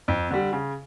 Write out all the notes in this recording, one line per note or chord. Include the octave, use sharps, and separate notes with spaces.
F2
D3 G3
C#3